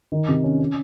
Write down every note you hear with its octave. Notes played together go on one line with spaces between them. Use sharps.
D#3
C3
C#4
C#4